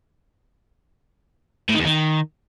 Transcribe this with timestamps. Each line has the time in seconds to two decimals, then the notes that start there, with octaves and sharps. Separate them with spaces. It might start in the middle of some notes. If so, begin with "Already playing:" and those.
1.69 A2
1.74 D#3
1.79 E2
1.85 D#3